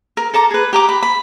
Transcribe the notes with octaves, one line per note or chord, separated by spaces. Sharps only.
A#4
A4 A5 A#5 D6
G#4 B4
G4 A#5 D6
B5
B5